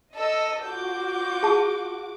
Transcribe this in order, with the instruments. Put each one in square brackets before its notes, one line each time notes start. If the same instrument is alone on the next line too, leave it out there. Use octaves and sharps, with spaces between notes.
[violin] A4 E6 [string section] D#5
[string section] F4 F#4 D6 [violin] G6
[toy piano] G#4 A5